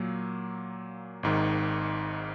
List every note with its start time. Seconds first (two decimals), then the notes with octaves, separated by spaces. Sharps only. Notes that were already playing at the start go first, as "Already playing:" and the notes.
Already playing: A#2 F#3 A#3
1.23 G#1 G#2 D#3